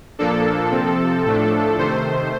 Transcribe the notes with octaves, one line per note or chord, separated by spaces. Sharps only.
A#2 F3 A#3 D4 A4
C3 F3 C4
A2 F3 A3 D4
C3 D#3 A3 C5